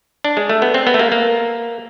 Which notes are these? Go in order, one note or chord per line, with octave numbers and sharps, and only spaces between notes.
D4
G#3
A3
B3
C4
B3
A3
A#3
A#3